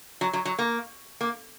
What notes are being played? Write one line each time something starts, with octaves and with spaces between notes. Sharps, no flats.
F#3
F#3
F#3
A#3
A#3